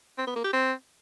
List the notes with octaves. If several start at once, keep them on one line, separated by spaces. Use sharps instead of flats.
C4
B3
A#3
G4
C4